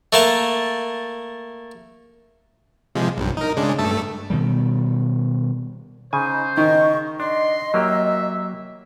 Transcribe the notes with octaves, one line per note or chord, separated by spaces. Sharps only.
A3 A#3 A5
C3 F3 G#3
B1 G2
D#4 A#4
C#3 G#3 D4
G2 A3 A4
B2 D#3 G3
C#3 D#4 C5 G#5
D#3 D#5 C#6
D4 D#5 C6
F#3 A#3 G4 E5